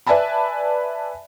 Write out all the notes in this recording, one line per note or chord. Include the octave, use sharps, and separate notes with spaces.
B4 D5 E5 G#5 A5 B5